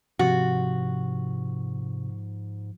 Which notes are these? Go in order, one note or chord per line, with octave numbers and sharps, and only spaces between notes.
G#2 C3 F3 F#4 A6